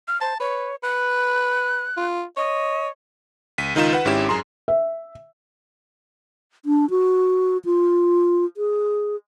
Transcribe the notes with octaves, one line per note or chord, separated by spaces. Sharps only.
F6
C5 A5
B4 C#5
B4 F#6
F4
C#5 D#5
C#2 B6 D#7
C#2 D#3 D#4 F4 E7
B4 F#5
G#1 G#2 C#4 E4 G4 E7
F#2 G#4 A#5 C6
E5
D4
F#4
F4
G#4